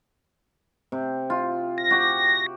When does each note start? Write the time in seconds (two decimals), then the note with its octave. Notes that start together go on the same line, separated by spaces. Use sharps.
0.92 C3
1.30 F4
1.78 A#6
1.91 F#4 G4